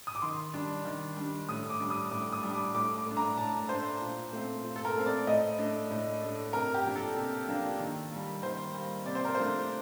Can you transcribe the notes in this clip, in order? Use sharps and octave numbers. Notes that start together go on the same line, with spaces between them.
D#6
D6
D#3 C6
G3 D4
D#3
G3 D4
A2 D#6
D6
G3 D4
D#6
A2 D6
D#6
G3 D4
D6
A2 D6
D6
A3 D4
A#5
A2 A5
A3 D4 C5
A#2
A3 C4
A#2
A4
A#4
A3 C4
D5
A2 D#5
A3 D4
A2
A3 D4
C3 A#4
G4
F3 A#3 D4
A4
C3
F3 A#3 D4
D#3
G3 A#3
D#3 C5
G3 A#3
C3 D5
C5
A#4
F3 A3 D4 C5